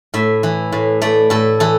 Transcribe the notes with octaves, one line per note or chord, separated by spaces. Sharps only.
A2 E5
E3
A2
A3 D5
A2 A4
E3 A4